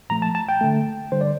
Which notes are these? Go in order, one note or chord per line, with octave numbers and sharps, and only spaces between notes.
A#2 F3 A3 A#5
A5
A5
G5
D3 A3
D3 G3 C5
D5